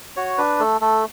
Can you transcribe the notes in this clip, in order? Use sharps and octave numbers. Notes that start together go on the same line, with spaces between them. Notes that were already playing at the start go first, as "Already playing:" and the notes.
F#4 C#5
D4 B4
A3 A4
A3 A4